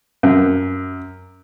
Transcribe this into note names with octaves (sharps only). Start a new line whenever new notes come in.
F#2